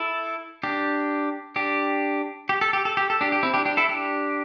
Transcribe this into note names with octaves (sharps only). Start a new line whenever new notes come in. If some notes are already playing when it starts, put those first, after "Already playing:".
Already playing: E4 A4
D4 G4
D4 G4
G4
A4
G4
A4
G4
A4
D4 G4
G4
C4 E4
D4 G4
D4 G4
E4 A4
D4 G4